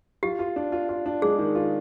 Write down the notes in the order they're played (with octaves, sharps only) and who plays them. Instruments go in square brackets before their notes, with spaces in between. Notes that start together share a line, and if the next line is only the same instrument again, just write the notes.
[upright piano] F4 [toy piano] G4
[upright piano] F4
D4
F4
F4
D4
[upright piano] G#3 [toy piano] G#4
[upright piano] D#3
F4